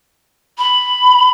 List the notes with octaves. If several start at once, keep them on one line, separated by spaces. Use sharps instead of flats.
B5